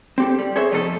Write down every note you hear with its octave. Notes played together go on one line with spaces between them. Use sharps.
C4 G4 A4
G3
G#4 A4 C5 C#5 E5
F2 A3 D#4 E4 A4